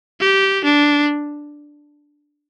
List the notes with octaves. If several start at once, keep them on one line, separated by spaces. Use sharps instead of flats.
G4
D4